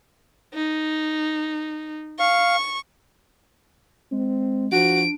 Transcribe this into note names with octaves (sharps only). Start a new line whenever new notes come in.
D#4
F5 C#6
G#3 C4
F3 D4 F#4 D7